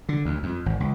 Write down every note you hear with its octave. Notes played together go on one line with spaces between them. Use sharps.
D3
D2
F2
G#1
C#2